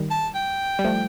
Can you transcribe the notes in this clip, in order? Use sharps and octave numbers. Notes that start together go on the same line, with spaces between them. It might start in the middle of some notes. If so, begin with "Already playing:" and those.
Already playing: D#3 G3
A5
G5
G3
F3 A3